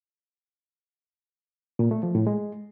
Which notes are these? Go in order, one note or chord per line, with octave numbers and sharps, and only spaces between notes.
A#2
A3
F3
A2
G#3